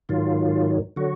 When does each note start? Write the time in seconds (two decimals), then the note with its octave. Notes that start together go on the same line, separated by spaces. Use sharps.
0.09 G#2 D#3 F#3 F4
0.96 D3 F#3 F#4